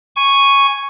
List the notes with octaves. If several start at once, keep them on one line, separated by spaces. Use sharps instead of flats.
G#5 C#6